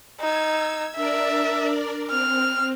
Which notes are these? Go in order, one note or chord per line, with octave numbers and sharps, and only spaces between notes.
D#4 E6 G#6
D4 A#4 D5 E5
C4 F6